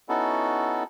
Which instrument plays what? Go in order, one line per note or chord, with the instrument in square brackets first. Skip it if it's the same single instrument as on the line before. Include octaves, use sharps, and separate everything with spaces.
[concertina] B3 C#4 D#4 E4 F#4 A4